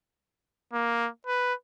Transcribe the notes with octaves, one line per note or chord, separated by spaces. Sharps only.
A#3
B4